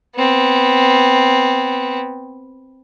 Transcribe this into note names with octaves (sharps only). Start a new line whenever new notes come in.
B3 C4